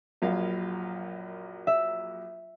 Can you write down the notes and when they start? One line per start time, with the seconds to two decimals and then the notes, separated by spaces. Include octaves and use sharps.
0.22 A#1 F#2 F5
1.67 E5